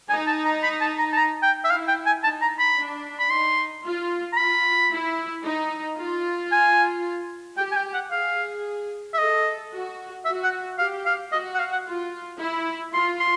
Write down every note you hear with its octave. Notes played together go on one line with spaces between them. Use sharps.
D#4 G#5
A5
A#5
B5
A5
A#5
A5
A#5
G5
E5
E4 F5
G5
G#5
D#4 A5
A#5
B5
D4
B5
D#4 C6
F4
A#5
F4 B5
E4
D#4
F4
G#5
G4 G5
G#5
G5
F#5
G#4 F5
E5
A4 D#5
F#4
F#4 E5
F#5
G4 F5
F5
F#4 D#5
F#5
F5
F#5
F4
E4
F4 C6
C6